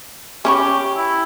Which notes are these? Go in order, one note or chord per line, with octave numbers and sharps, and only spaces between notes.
C#4 G4 C#5 B5
E4